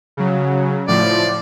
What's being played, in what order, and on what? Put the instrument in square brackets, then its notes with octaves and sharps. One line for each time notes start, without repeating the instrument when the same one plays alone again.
[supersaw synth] C#3 F#3
[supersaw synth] A2 F3 [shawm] D5